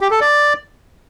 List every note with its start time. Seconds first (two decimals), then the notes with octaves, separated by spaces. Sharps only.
0.01 G4
0.11 A4
0.21 D5